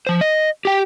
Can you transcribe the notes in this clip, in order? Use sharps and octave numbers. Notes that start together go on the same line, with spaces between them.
F3 C5
D#5
G4 G5